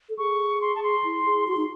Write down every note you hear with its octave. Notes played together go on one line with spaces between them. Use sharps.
A4
G#4 C#6
C6
A5
C6
E4
G#4
F#4 C6
D#4